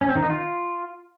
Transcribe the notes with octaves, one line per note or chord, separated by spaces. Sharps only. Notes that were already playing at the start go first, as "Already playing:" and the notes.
C#4
C4
D#3
D#4
F4